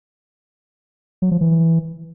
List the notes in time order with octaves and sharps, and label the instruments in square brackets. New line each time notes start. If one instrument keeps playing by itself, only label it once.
[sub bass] F#3
F3
E3